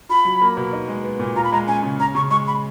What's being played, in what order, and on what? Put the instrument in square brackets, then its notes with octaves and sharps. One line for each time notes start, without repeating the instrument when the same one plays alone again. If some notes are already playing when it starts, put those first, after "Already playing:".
[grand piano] F4 [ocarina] B5
[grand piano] F#3
A#3
B2
D#4
G#3
B3
A#2
[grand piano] F4 [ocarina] A#5
[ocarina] B5
[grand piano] G#3 [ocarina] A#5
[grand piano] C#4 [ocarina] G#5
[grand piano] C#3
[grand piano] C#4 [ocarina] A#5
[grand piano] C#3 [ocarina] C#6
[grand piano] G#3 [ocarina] C#6
[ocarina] B5